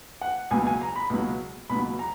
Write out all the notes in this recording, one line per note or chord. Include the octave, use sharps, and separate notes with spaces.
F#5
C#2 B2 F#3 G#5
G#5
A#5
B5
C#2 B2 F#3
C#2 B2 F#3 B5
A#5